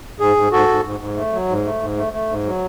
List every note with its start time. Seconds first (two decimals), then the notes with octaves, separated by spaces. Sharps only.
0.20 G#2 G#4
0.37 G#2
0.52 G#2 F#4 A4
0.68 G#2
0.84 G#2
1.00 G#2
1.16 A3
1.32 F#3
1.49 G#2
1.65 A3
1.81 G#2
1.97 A3
2.13 A3
2.29 G#2
2.45 F#3